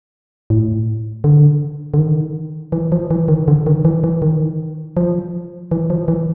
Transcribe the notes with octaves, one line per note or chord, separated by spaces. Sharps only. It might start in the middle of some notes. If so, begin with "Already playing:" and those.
A2
D3
D3
D#3
E3
F3
E3
D#3
D3
D#3
E3
E3
D#3
F3
E3
F3
E3